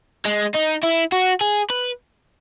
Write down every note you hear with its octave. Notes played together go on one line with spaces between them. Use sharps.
G#3
D#4
E4
F#4
G#4
B4